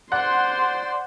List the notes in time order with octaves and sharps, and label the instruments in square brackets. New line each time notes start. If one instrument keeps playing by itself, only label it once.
[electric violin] C5 C6 [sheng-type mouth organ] D5 [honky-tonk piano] F#5 F#6